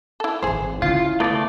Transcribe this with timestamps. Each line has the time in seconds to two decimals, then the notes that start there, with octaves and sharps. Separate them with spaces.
0.20 E4 A4
0.42 G#1 E3 G#4 C5
0.82 C#3 E4 F4 F5
1.20 A3 B3 F4 D5